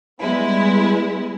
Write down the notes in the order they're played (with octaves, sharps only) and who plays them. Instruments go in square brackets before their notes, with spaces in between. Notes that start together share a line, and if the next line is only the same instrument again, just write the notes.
[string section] G3 G#3 B3 E4